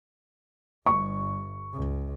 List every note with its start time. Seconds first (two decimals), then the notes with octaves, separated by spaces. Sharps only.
0.86 G1 G2 C#6
1.74 C#2